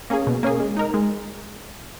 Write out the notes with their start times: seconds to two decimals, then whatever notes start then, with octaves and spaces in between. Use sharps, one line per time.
0.10 A#3 C#4 G#4
0.27 B2
0.43 A#3 C#4 G#4
0.60 G#3
0.77 D#4 A#4
0.94 G#3